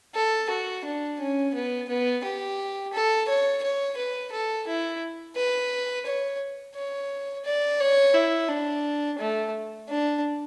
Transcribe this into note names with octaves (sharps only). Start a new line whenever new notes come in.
A4
F#4
D4
C#4
B3
B3
G4
A4
C#5
C#5
B4
A4
E4
B4
C#5
C#5
D5
C#5
E4
D4
A3
D4